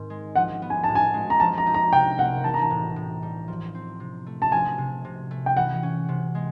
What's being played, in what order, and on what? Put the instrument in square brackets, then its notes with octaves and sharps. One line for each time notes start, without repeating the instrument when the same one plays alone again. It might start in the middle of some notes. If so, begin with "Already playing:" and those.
Already playing: [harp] G#2 D#3 C4
G#3
[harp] F3 [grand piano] F#5
[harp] B3
[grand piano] G#5
[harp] A2 [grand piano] A5
[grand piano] G#5
[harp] G#3
[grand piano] A#5
[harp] F3 [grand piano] A5
[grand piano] A#5
[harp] D#4
[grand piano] A#5
[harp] C3 [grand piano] G5
[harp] A#3 [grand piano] F#5
[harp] E3 [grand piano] A5
[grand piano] A#5
A5
[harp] A2
A2
G3
F3
C4
C3
A3
[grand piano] A5
[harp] F3 [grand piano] G#5
[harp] C3
C3
A3
[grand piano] G5
[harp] E3 [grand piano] F#5
[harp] C#4
C3
G#3